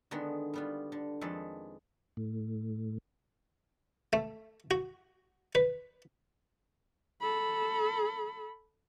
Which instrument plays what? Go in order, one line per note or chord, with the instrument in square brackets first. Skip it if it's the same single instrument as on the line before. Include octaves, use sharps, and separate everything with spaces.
[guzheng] D3 D#3 G#3 B3
G3 B3 F4
D3
F2 D#3 G#3 A4 B4 D5
[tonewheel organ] A2
[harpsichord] A3
F#4
B4
[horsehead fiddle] A4 B5